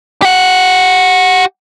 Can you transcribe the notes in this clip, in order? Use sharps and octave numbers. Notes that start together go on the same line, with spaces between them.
G4 F#5